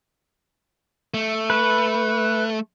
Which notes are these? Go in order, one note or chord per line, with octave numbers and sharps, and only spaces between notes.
A3
B4